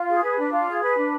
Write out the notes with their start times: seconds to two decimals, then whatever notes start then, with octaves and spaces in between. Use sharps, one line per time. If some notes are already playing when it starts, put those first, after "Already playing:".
Already playing: F4
0.08 G#4
0.23 B4
0.38 D4
0.52 F4
0.67 G#4
0.81 B4
0.96 D4